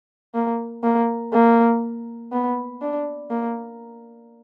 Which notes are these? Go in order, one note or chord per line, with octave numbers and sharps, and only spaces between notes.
A#3
A#3
A#3
B3
D4
A#3